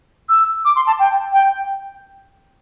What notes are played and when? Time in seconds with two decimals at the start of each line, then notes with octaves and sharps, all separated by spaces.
0.29 E6
0.65 D6
0.76 C6
0.87 A5
0.99 G5
1.33 G5